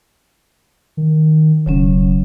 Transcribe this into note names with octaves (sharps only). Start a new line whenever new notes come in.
D#3
E1 C#3 F#3 C#4